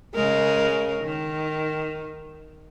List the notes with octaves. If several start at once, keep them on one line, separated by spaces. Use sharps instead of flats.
C#3 G#3 A#4
D#3